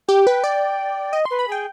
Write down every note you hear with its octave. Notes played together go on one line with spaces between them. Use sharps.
G4 G5
B4
D5
D#5
B4 C6
B5
G#4 G5